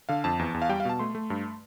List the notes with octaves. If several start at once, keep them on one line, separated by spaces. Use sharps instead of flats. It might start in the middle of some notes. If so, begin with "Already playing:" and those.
D3 F5
F2 A5
E2
E2
F5
G3 G5
F5
B2 A5
A3 C6
A3
G2